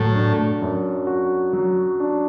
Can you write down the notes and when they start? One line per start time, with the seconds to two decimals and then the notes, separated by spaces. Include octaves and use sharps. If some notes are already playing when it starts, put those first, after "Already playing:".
Already playing: A2 F#3 F#4
0.15 D4
0.62 F#2
1.07 F#4
1.53 F#3
2.00 D4